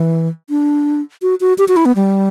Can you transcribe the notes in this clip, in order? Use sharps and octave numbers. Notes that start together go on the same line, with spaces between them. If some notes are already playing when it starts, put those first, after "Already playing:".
Already playing: E3
D4
F#4
F#4
G4
F#4
E4
B3
G3